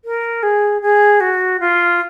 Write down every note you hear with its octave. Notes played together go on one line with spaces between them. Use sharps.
A#4
G#4
G#4
F#4
F4